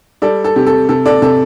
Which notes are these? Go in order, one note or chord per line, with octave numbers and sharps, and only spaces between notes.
G3 A4 D5
A4
C3 G4
A4
C3 A4
A4 D5
C3 A4